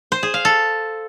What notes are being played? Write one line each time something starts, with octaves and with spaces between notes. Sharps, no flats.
C5
G#4
F5
A4